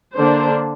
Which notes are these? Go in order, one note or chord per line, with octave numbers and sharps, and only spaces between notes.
D3 A#3 D4 C5